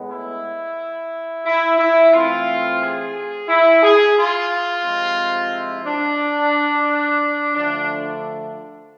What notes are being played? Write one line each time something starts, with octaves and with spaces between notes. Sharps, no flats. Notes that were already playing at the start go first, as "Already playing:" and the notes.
Already playing: A2 G#3 B3
E4
E4
E4
E3 A3 C4 F4
G#4
E4
G#4
F4
C3 F3 G#3 C4
E4
D4
D3 F3 A3 D4